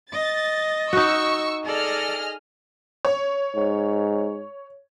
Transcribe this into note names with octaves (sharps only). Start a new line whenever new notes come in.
D#5 A6
D#4 F#4 C#6 E6
G#4 A4 D5 D#5 F6
C#5
G#2